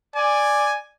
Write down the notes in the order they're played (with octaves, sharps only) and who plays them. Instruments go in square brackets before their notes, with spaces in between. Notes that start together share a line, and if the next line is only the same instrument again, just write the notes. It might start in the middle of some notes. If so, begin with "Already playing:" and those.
[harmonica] D5 [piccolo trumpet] G#5